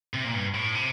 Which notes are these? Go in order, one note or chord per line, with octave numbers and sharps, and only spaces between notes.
C3
A#2
G2
A2
C3